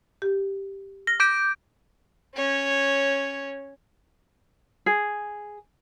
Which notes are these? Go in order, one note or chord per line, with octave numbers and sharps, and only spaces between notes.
G4
F6 A#6
D6 G6 D7
C#4 C#5
G#4